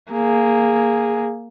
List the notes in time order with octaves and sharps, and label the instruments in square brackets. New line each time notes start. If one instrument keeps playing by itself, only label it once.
[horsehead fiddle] A#3 G#4